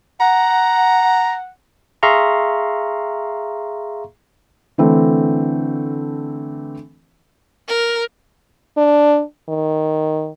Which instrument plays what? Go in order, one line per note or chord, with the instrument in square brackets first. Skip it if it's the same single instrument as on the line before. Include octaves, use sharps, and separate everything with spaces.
[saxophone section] F#5 [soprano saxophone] A#5
[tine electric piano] G#4 E5 F5 A#5 C6 C#6
[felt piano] D3 E3 A3 C4
[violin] A#4
[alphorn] D4
D#3